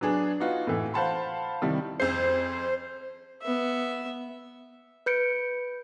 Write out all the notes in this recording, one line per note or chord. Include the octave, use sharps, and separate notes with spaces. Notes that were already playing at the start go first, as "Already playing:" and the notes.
F#3 B3 D4 G#4
B3 D#4 F4 F#4
A2 E3 A3
C5 F5 F#5 A5 B5 C6
C3 D#3 G3 E4
F2 G#4 C5 C7
B3 E5
B4 G6 C#7 D7